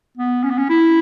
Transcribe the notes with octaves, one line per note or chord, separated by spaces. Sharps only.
B3
C#4
B3
C#4
E4